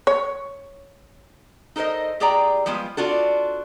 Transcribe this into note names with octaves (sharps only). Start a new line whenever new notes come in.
C#5
D#4 A4 A#4 C5 D#5
A2 G4 G#4 D5 G5 A#5
F3 G3 G#3 B3 F4
C4 D4 F4 F#4 A4